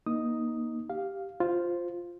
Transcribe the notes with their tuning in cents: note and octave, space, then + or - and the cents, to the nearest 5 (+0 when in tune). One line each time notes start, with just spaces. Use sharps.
A#3 +30 D#4 +0 D#6 +0
G4 +0 F5 +0
F4 +0 C5 +0